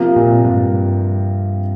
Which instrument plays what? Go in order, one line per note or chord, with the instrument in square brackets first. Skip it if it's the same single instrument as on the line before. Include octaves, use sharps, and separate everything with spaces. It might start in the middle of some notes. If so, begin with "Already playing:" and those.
Already playing: [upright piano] C3 F3 A#3 F4
[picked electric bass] A#2
G2